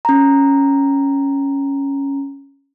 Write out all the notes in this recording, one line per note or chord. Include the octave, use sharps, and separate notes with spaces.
C#4 A#5